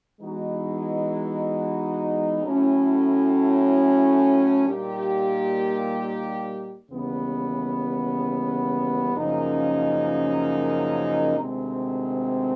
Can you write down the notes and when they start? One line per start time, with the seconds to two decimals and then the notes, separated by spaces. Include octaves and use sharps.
0.20 E3 G#3 B3 D#4 F#4
2.43 A2 F#3 A3 C#4 E4
4.66 A#2 G3 A#3 D#4 G4
6.90 D#2 C#3 E3 G3 B3
9.13 F#2 C#3 F3 A#3 D#4
11.36 D2 C3 D#3 G#3 C4